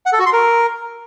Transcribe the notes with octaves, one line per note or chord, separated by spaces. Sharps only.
F#5
A4
F#4
C6
A#4